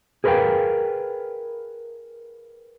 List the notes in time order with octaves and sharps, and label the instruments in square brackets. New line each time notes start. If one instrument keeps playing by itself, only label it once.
[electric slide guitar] G#4 A#4 B4 C#5 F5 G5